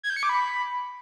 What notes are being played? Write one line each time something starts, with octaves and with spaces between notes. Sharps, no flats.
G#6
G6
C#7
D6
B5